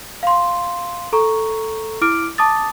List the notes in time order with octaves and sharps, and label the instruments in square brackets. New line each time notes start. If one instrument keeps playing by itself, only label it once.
[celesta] F5 C6
A4 A#5 C#6
E4 D6 F6 D7
A5 D6 D#6 A6